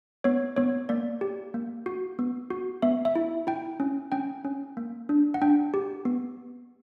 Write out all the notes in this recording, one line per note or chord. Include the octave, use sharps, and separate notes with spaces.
B3 C#5
B3 C#5
A#3 D5
G4
A#3
F#4
B3
F#4
B3 E5
E5
E4
E4 G5
C#4
C#4 G5
C#4
A#3
D4
F#5
D4 G5
G4
B3